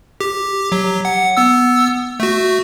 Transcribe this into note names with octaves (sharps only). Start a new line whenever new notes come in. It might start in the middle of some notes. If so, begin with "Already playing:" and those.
G4
F#3
F#5
B3 E6
A3 F#4